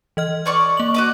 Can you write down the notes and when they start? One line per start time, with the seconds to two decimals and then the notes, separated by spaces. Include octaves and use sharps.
0.17 E3 D#5 F6
0.46 C#5 D5 C#6
0.77 A#3 F#7
0.94 F#4 D#5 D6